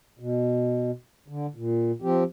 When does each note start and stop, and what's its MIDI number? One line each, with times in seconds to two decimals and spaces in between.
0.19 0.91 47
1.28 1.46 50
1.56 1.92 46
2.02 2.24 53
2.02 2.24 60
2.02 2.24 67